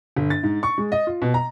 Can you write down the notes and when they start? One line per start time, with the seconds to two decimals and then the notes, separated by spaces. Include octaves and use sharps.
0.17 G1
0.30 A6
0.43 G#2
0.63 C#6
0.78 G#3
0.92 D#5
1.07 F4
1.22 B2
1.34 A#5